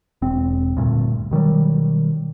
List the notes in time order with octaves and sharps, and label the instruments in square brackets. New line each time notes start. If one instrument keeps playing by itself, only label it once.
[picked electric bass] E1 C4
D2 G2 A#2
B2 D#3 F#3 G3